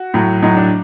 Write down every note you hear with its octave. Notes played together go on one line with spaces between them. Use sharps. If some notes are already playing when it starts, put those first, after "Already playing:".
Already playing: F#4
A2 F#3
A2 F#3 D#4
D4